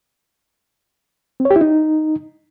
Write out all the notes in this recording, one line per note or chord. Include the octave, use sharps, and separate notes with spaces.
C4
C#5
G4
E4
D#4